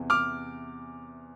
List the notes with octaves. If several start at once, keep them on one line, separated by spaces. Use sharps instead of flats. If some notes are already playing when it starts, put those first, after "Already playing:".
Already playing: E2 C3 E3
D6 F6